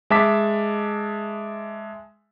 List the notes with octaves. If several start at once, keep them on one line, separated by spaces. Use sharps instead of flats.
G#3 E5 A5 D6 B6